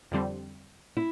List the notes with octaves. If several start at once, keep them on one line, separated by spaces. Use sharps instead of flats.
F2 D3 G3 C4
E4